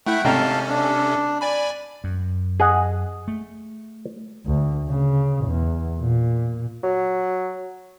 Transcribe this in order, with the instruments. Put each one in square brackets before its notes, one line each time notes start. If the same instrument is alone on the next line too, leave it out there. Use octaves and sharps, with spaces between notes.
[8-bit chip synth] A3 E4 E5 [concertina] F#5 G5
[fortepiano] G#1 G5 A#5 [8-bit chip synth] C3 C#4 A4 [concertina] F5 A5
[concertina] D4
[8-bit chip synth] D5 G#5 B5
[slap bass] F#2
[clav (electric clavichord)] G#4 D#5 F#5
[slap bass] A3
[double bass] D2
C#3
E2
A#2
[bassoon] F#3